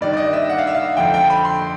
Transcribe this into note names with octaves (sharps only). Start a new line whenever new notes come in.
G2 D#3 D5
D5
D#5
E5
F#5
F5
E5
F5
F2 D3 G5
G5
B5
C6